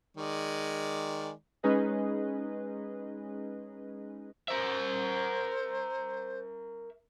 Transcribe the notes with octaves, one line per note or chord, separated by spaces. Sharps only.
D#3 G#3 D5
G#3 C#4 D#4 G#4 B4 D#5
A#4 C5 E5